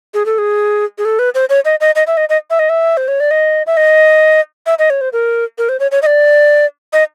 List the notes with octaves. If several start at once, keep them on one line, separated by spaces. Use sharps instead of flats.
G#4
A4
G#4
G#4
A4
B4
C5
C#5
D#5
D#5
D#5
E5
D#5
D#5
E5
D#5
E5
C5
C#5
D5
D#5
E5
D#5
E5
D#5
C#5
C5
A#4
A#4
C5
C#5
C#5
D#5
D5
D#5